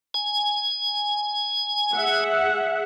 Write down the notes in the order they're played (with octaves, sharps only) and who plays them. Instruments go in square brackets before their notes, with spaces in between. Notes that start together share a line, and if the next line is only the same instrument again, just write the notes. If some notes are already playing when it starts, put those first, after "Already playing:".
[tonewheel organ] G#5
[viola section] G#4 E5 F#5